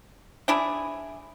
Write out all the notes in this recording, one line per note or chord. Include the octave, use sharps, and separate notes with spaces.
D4 E4 G#4